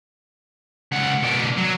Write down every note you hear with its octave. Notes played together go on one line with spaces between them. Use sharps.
C#2 F#5
B2 D5
F#3